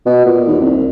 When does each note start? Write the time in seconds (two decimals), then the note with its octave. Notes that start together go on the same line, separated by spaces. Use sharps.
0.06 B2
0.25 A#2
0.48 D#2
0.60 C2